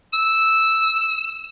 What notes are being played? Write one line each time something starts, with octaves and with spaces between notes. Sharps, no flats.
E6